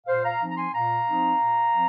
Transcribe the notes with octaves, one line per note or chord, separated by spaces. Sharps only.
A#2 C5 F5
F5 A#5
F3 C4 D#4
A#5
G#5 C6
A#2 F5 A#5
F3 C4 D#4
A#2
F3 C4